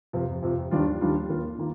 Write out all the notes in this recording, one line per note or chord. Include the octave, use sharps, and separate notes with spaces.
F2 C3 F3
F2 C3 F3
D#2 D#3 G3 D4 F4
D#2 D#3 G3 D4 F4
D#2 D#3 A#3 F4 A#4
D#3 A#3 F4